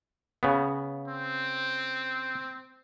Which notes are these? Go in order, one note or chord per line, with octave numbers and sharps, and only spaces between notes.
C#3 B3
C4